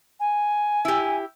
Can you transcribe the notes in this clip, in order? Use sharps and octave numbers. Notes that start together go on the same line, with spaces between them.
G#5
E4 G4